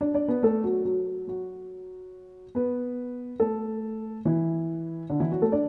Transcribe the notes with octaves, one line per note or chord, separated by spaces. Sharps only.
D4 D5
D4 D5
B3 B4
A3 A4
F#3 F#4
F#3 F#4
F#3 F#4
B3 B4
A3 A4
E3 E4
D3 D4
E3 E4
F#3 F#4
A3 A4
D4 D5